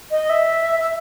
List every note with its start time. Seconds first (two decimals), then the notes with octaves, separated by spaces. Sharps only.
0.11 D#5
0.30 E5
0.80 E5